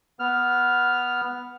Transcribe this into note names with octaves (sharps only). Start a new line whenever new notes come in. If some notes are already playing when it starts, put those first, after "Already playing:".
B3 F6